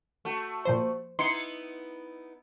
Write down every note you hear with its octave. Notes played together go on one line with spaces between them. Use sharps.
A3 F#4
A#2 F3 C5
B3 D#4 E4 C6 C#7